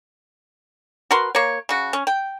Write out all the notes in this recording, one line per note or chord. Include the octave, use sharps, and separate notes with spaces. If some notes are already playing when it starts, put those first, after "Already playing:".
F#4 A#4 B4 C6
A#3 C#5
C#3 F#4
C#4
G5